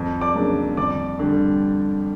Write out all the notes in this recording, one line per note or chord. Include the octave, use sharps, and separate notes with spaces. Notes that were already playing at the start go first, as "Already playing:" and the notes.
Already playing: F2
D5 D6
C#3 F#3 A#3 D4
F2 D5 D6
D3 G3